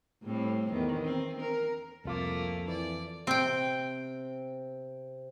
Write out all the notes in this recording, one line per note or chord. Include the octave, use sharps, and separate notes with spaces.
A2 G3 C4
E2 D#3
C4
A#4
C2 F2 A3 A#3 F4 D6
E3 D5
C3 C4 G5